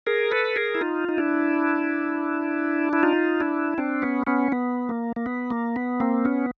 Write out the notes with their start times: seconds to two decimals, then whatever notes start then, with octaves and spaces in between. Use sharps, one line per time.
0.07 G#4 A#4
0.31 A4 B4
0.56 G#4 A#4
0.75 E4
0.81 D#4 F4
1.09 D#4
1.18 D4 E4
2.93 E4
3.03 D#4 F4
3.40 D4 E4
3.78 C4 D4
4.02 B3 C#4
4.27 B3 C#4
4.52 B3
4.89 A#3
5.16 A#3
5.26 B3
5.51 A#3
5.76 B3
6.00 A#3 C4
6.25 B3 C#4